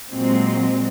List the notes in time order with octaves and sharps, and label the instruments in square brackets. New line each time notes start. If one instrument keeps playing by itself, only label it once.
[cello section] A#2 F#3 G#3 C4